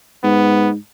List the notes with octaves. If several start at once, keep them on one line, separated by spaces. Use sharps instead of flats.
G#2 B3